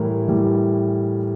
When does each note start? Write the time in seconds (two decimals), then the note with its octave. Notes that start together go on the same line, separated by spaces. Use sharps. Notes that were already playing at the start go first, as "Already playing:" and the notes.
Already playing: A2 E3 G3 A#4
0.27 A2 E3 G3